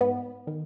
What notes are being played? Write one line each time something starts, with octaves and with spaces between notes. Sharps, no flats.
G#2 B3
D#3